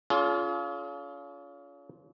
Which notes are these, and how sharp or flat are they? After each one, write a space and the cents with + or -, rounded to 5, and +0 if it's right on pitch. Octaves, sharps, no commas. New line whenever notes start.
C#4 +40 F4 +0 G#4 +40